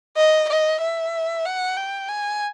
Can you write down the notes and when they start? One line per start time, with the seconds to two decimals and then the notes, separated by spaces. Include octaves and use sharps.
0.17 D#5
0.49 D#5
0.81 E5
1.45 F#5
1.77 G5
2.09 G#5